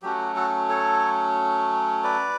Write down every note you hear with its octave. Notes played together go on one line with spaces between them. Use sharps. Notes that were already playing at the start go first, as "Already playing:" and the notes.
F#3 A3 C#4 F#4 G4
F#4 A4
A4 C#5
B4 D5